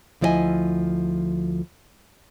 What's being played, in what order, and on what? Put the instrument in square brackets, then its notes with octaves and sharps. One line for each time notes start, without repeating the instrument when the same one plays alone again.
[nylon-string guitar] D2 F3 E4 D5 D#5 G#5